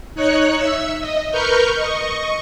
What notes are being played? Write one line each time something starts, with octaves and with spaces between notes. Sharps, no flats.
D#4 C#5 F#6 C#7
E5 E6
D#5
A#4 B4 C#6 F6 G6
D#5 C#6